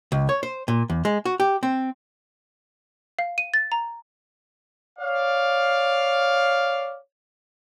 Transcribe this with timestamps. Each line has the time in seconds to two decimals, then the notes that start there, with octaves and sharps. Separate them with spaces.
0.12 C#2
0.29 C#5
0.43 C5
0.68 A#2
0.90 E2
1.05 G#3
1.25 F#4
1.40 G4
1.63 C4
3.19 F5
3.38 D#7
3.54 A6
3.72 A#5
4.99 C#5 D5 F5